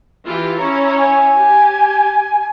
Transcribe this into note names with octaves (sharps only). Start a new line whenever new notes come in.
E3 F4 G4
C#4 E4 C#5 A#5
G#5
G4